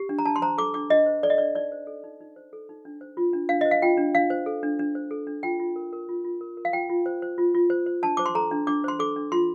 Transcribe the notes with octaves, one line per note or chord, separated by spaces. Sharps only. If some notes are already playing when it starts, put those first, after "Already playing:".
Already playing: G4
D4
A#5
D4 A5
C6
C5 A#5
A4 D6
D4 D6
D4 D#5
C5
A4 D5
D#5
D4 D5
D#4 D5
C5
A4
D#4
D#4
C5
A4
D#4
D4
C5
F4
D4
D4 F5
C5 D#5
F5
F4 G5
D4
D4 F5
C5
A4
D4
D4
C5
A4
D4
F4 G5
F4
A#4
A#4
F4
F4
A#4
A#4
F5
F4 G5
F4
C5
C5
F4
F4
C5
C5
D4 A5
C5 D6
C6
A4 A#5
D4
D4 D6
C5 C6
A4 D6
D4
F4 C6